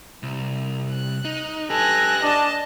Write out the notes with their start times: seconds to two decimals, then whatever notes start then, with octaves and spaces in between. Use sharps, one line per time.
0.23 C2
0.91 F#6
1.25 D#4
1.70 G4 A4 B4 G#5 F#6 A#6
2.22 D4 D#5 A5